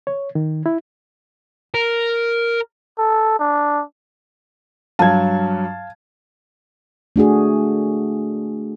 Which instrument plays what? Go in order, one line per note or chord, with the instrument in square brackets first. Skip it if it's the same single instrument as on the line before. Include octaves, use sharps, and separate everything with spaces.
[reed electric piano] C#5
D#3
E4
[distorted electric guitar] A#4
[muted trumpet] A4
D4
[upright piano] G2 F#3 G#6 [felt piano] F5 A5
[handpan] A3 D4 F#4 G#4